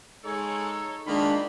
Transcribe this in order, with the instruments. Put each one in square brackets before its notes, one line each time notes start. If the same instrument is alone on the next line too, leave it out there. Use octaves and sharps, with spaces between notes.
[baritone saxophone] G#3 [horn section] D#4 A4 C#5
[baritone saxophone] D#3 [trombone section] G#3 D4 [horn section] A#3 F4 B5